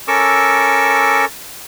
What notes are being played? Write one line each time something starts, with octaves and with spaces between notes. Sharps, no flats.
C#4 A4 A#4 C#6 D6 E6